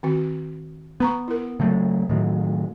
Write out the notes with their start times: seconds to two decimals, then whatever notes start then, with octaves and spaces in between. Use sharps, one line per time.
0.03 D#3 C4 F#4
1.00 B3 B4 A#5 C#6
1.28 E4 A#4
1.60 C#3 F#3 A3
2.09 A2 D#3 F#3